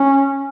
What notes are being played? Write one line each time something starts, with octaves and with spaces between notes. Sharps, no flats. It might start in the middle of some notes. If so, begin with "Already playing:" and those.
Already playing: C#4